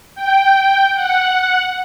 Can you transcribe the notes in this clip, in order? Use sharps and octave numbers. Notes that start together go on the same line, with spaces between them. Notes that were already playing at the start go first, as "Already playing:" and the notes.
G5
F#5